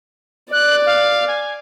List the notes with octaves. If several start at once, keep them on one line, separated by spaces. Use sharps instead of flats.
D5 F#6
F5
G#5